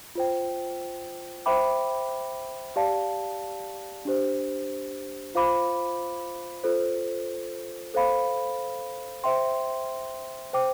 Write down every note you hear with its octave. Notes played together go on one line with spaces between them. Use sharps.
F4 C5 G5
C5 E5 G5 B5 D6
G4 D5 F5 A5
D4 G4 C5
F4 C5 F5 B5 D6
F4 A4 C5
A4 C5 F5 B5
C5 E5 G5 C6
C5 G5 D6